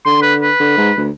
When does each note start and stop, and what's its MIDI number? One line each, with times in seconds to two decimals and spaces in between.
0.06 0.49 50
0.06 0.18 84
0.22 0.34 71
0.41 1.07 71
0.60 0.76 50
0.77 0.91 44
0.97 1.10 38